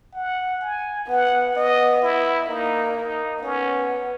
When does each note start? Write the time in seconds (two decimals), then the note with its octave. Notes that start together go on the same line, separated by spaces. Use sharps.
0.14 F#5
0.61 G#5
1.08 B3 F#5
1.56 B3 D#5
2.02 E4
2.49 A#3 D#4
2.96 D#4
3.43 B3 C#4